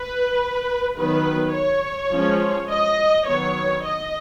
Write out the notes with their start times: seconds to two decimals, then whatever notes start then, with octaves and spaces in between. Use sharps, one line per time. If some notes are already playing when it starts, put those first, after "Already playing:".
Already playing: B4
0.98 D#3 F#3 B3 B4
1.55 C#5
2.12 F3 G#3 C#4
2.71 D#5
3.28 D#3 F#3 B3 C#5
3.84 D#5